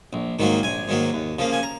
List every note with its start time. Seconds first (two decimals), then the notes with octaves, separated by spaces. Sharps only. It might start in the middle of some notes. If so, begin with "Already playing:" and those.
0.13 A#1
0.39 G#2 D#3 F#3 A#3
0.63 A#1 G#5
0.88 G#2 D#3 F#3 A#3
1.13 D#2
1.39 C#3 F3 A#3
1.53 G#5
1.63 A#5